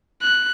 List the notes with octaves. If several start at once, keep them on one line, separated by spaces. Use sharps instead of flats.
F#6